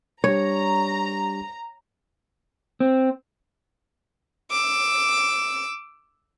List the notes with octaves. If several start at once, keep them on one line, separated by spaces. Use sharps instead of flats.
G3 D4 G4 C#5 A#5
C4
D6 E6